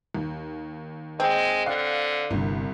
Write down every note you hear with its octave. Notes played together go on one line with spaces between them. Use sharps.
D#2
G#3 C4
D3 F5 F#6
G1 C2 G2 C3